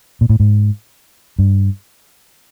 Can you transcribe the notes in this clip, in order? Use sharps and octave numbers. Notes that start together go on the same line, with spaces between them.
A#2
A2
G#2
G2